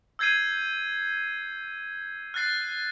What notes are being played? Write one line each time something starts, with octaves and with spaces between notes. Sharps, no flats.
E6 G6 G#6 C7 D#7
F6 F#6 A6 C7